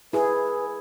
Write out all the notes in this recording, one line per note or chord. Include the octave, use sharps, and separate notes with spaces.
E4 G#4 B4